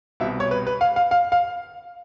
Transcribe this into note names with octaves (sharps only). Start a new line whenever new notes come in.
C2 B2 G3 E5
C#5
B4
B4
F5
F5
F5
F5